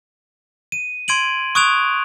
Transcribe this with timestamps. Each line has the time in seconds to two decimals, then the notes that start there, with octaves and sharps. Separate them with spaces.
0.72 D#7
1.08 C6 G#6 D7 D#7 F#7
1.55 C#6 D#6 F#6 G#6 D7 F7